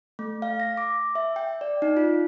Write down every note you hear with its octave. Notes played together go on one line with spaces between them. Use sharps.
A3
F5
A#6
D6
E5
G5
D5
D#4
F4